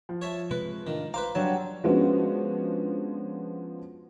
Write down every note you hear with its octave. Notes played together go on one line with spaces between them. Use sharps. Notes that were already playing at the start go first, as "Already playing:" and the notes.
F3
C#5 E5 A5
C3 G#3 B4
A2 D#3 D4 F4
B4 C5 F5 A#5 D6
F#3 G3 D4 C#5 A5
F3 G#3 B3 C#4 D4 F#4